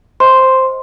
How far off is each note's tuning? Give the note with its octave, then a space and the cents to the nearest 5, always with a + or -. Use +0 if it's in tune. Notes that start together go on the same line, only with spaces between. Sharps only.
C5 +0 D#5 +20 C6 +0